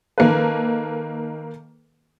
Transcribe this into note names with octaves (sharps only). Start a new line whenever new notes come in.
D#3 A#3 A4 B4